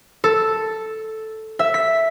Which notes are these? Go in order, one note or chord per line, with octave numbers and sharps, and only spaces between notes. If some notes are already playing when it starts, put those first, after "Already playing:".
A4
E5
B6